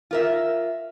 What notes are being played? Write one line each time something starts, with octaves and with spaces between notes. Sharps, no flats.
F4 A#4 E5